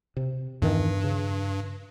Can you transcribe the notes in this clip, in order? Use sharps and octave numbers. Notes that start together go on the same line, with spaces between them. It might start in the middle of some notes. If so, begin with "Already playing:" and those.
C3
E2 G2 D#3 E3
C#3